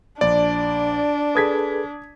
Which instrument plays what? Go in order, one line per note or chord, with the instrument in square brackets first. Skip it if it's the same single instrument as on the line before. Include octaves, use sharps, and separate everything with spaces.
[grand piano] A#1 [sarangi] D4 [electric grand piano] D5
[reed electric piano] G#4 A4 B4 [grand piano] D#6 G#6 B6